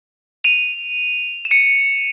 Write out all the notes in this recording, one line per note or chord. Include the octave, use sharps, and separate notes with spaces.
D#7 F7
E7
C#7 D#7